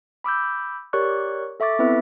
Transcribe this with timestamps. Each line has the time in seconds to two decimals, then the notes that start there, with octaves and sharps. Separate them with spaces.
0.24 B5 D6 E6 G6
0.93 G4 A#4 C#5 D5 C#6 F#6
1.60 A4 E5 C#6 D6 A6
1.79 B3 C4 E4 B4 E5